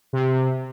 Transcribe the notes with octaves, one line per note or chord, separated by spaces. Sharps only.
C3